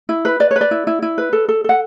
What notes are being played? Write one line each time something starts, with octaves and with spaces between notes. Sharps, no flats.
E4
B4
B4 D5
C#5
B4
D5
E4
E4
E4
B4
A4
A4
A4 F#5